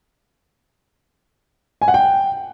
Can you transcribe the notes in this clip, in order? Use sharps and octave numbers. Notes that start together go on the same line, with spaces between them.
G#5
F#5
G5